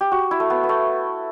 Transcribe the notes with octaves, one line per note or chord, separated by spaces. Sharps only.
G4
F#4
E4
A3
B3
B3
A3